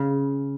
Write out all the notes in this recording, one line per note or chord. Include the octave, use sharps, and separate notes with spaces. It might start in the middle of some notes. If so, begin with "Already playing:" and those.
Already playing: C#3